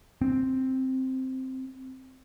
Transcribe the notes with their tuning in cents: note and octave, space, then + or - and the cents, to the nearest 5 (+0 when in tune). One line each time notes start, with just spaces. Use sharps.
C4 +0